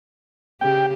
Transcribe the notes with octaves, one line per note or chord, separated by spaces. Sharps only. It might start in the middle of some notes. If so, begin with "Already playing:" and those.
C#3 G4 G5